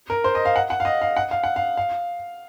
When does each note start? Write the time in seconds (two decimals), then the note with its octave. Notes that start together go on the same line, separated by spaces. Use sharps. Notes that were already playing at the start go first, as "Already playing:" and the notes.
0.10 A#4
0.24 C5
0.35 D#5
0.45 F5
0.56 F#5
0.70 F#5
0.80 F5
0.85 D#5
1.01 F5
1.17 F#5
1.31 F5
1.44 F#5
1.56 F5
1.77 F5